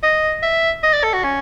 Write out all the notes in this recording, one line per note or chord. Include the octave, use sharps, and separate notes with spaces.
D#5
E5
D#5
D5
A4
F#4
C#4